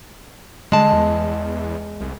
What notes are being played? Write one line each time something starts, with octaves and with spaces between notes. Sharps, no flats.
D3 G#3 A5
E2
C2